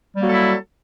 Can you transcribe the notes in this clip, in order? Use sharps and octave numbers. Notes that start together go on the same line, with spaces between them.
F#3 G3 A#3 E4 A4